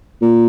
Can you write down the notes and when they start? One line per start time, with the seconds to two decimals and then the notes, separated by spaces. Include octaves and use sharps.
0.22 A#2